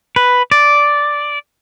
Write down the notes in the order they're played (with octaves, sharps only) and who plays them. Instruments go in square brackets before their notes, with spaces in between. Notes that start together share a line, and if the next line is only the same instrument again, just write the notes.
[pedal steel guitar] B4
D5